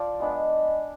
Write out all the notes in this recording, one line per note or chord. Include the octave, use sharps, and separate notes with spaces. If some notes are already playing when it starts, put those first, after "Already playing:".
Already playing: F3 D5
G#3 B3 D4